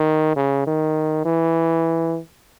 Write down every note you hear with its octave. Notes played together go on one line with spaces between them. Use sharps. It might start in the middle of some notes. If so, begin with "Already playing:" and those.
Already playing: D#3
C#3
D#3
E3